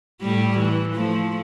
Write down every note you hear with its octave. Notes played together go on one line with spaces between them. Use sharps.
A2 G3
E3
F3 A3